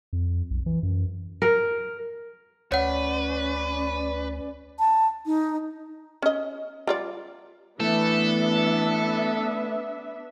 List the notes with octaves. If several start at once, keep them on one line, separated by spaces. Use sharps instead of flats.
F2
B1
E3
F#2
A#4
D2 C#4 B4 C#5 D5 F#5
A5
D#4
C#4 D#5
G3 F4 D5
E3 A3 B3 D4 A4 E5